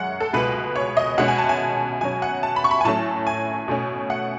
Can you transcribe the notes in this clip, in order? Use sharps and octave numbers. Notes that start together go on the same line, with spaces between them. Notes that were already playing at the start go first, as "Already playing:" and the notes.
Already playing: F#2 G#3 C#5 F#5
A4
C#2 B2 G#3 B3 B4
C#5
D#5
B2 G#3 C#4 F#5
G#5
A5
G#5
B2 F#3 C#4 G#5
F#5
A5
B5
C#6
B5
G#5
A2 F#3 A3 C#4 A5
G#5
B2 A3 C#4
F#5